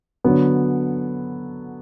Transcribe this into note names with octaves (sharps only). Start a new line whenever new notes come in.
D3 F#3 B3